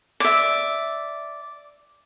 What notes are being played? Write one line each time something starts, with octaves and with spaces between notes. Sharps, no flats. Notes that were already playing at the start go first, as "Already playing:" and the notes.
D5 E5